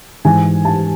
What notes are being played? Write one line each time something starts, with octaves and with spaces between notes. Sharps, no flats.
G#2 E3 G#5
A5